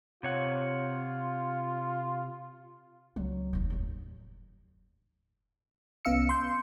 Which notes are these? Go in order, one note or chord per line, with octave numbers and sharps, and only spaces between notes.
C3 F4 C#5 F#5
C#2 F#3
F1 D#2 D#4
A1 G2
C2 B3 C#4 F5 E6 C#7
C6 G6